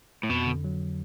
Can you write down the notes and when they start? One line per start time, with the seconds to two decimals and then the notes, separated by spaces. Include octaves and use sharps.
0.23 A2
0.30 F2 B2
0.46 D3
0.64 F#3